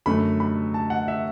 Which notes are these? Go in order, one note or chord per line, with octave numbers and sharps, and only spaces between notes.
F#2 D3 A3 B5
B5
A5
F#5
E5